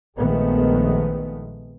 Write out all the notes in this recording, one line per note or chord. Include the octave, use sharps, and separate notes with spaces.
A#1 D#3 G#3 A3 B3